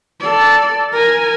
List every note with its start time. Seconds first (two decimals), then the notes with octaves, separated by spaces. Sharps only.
0.20 A4 D5
0.92 A#4 G#5